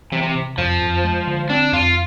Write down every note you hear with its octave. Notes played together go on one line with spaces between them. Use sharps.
C3 E3
C3
C3
F2 F3
F2
G#3
D3
C4 D4
F2 F4